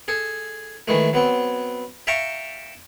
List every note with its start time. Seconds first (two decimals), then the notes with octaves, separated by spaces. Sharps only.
0.08 G#4 A4
0.88 D#3 E3 G#3 A3
1.13 F#3 B3 C4
2.07 E5 F5 G5 A5 A#5 C#6